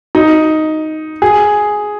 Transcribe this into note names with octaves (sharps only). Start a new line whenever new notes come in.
D#4
G#4